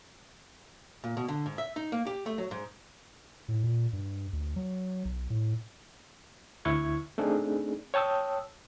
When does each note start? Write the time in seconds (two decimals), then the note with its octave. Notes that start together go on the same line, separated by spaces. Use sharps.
1.04 A#2
1.17 B2
1.28 D3
1.46 G#2
1.58 E5
1.76 D#4
1.92 A#3
2.07 G4
2.26 A3
2.38 F#3
2.51 G#2
3.48 A2
3.64 A#2
3.93 G2
4.33 D2
4.56 F#3
5.05 B1
5.30 A2
6.65 D2 E4 C#6 G#6
7.18 A3 C4 D4 D#4 G#4
7.94 C#5 G5 A5 D#6 E6